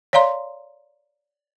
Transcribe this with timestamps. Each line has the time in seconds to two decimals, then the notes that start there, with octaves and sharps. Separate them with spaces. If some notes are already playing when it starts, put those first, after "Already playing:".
0.13 C#5 D5 F5 A#5 C6